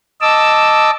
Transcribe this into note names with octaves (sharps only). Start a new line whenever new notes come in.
D#5 A5 D6 E6